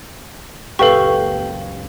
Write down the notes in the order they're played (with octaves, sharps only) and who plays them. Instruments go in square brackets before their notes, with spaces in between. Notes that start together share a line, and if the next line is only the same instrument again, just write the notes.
[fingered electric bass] F#1 C#2 A#2 [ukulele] G4 F5 [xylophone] A4 B4 C#6